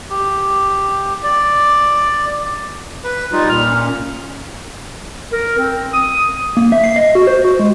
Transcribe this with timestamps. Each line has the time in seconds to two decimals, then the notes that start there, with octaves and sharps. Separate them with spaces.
0.10 G4
1.23 D5
3.04 B4
3.32 G3 D#4 F4
3.49 A#2 F6
3.69 C#4
5.32 A#4
5.59 C4
5.93 D#6
6.57 A#3
6.72 E5
6.84 C7
6.96 D#5
7.15 F#4
7.27 C5
7.45 F#4
7.59 G#3